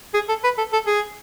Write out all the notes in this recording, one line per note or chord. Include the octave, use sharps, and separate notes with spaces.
G#4
A4
B4
A4
A4
G#4